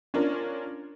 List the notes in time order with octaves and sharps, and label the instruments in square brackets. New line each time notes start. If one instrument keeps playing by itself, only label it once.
[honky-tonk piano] C#4 D4 F4 A#4